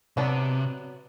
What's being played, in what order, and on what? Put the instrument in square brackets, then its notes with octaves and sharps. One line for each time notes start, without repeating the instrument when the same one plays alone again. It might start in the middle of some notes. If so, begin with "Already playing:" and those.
[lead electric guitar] C3 [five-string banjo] F#3 B3 D4